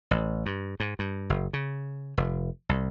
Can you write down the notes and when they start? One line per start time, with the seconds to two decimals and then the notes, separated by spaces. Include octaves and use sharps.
0.11 A1
0.46 G2
0.80 G#2
0.99 G2
1.30 F#1
1.53 C#3
2.17 F1
2.69 C2